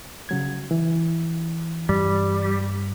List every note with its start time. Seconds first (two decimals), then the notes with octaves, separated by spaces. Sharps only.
0.29 C#3 F#3 G#6
0.71 E3
1.89 G2 G3